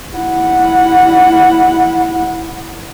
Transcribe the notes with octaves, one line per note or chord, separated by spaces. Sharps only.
E4 F#5